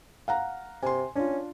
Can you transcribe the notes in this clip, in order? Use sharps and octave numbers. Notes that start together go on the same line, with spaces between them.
F5 F#5 A#5
C3 G#5 C6
C#4 D4 F4